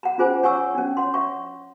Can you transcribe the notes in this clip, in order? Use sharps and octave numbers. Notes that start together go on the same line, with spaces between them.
F#5 A#5
C#4 F4 G#4 C5 G#5
C#5 F#5 G#5 C#6 E6
C#4 D4
C#5 F#5 C6
E5 C#6